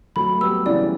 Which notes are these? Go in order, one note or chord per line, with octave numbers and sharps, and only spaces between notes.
F#3 A3 B5
G3 B3 E6
C#3 E3 D5